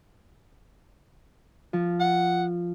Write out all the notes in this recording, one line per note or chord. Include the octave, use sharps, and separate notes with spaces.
F3
F#5